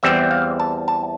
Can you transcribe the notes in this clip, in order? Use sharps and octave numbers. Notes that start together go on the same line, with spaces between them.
E2 E3 G3 C4 E5
F5
A5
A5